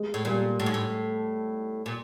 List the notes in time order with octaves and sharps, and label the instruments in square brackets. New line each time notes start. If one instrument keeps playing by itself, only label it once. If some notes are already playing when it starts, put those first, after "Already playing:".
Already playing: [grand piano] G#3
[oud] A2
[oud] A#2 [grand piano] G3
[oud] A2
G#2
A2
A#2